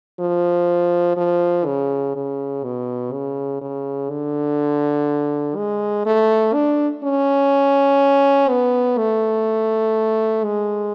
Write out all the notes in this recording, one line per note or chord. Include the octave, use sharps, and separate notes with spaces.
F3
F3
C#3
C#3
B2
C#3
C#3
D3
G#3
A3
D4
C#4
B3
A3
G#3